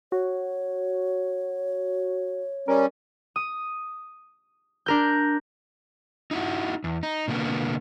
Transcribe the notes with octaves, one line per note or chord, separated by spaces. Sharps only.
F#4 C#5
G3 C#4 A#4
D#6
D4 A#4 G6
D#4 E4 F#4
E2
D#4
B2 D3 A#3 B3